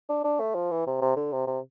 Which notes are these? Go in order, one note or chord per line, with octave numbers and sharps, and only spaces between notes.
D4
D4
A3
F3
E3
C3
C3
D3
C3
C3